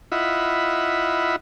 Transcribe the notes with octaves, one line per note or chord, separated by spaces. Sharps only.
E4 F4 D#5 E5 F#5 B5